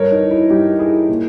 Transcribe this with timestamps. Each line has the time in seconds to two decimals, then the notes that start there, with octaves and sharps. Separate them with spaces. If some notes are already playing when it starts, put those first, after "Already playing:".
Already playing: G2 A#4 C#5
0.12 D#4
0.21 E3
0.31 E4
0.50 G2 D#4 G4
0.79 E3 E4 G#4
1.09 A#2